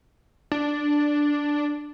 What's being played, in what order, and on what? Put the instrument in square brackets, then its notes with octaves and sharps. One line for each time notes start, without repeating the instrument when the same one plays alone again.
[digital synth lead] D4